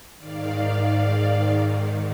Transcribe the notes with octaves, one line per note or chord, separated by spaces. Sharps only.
G#2 D#3 D5 F5